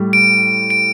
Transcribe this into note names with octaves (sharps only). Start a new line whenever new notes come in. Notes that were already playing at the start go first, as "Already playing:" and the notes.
Already playing: A2 G3
D7
D7